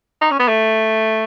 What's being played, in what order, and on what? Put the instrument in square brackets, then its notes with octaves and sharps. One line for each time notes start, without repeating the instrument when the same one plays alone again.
[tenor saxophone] D#4
C#4
B3
A3